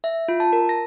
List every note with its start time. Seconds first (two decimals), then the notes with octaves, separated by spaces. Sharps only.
0.04 E5
0.28 F4
0.40 A5
0.53 A#4
0.69 A#6